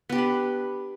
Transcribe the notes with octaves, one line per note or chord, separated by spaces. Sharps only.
B3 D4 G4 B4